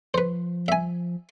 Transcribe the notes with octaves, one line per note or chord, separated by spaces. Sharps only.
F3 B4 C5
E5 G#5